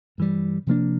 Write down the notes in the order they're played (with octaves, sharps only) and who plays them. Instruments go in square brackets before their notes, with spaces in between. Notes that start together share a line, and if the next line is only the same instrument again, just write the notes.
[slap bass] G2 E3 G3
C3 F3 A#3 D4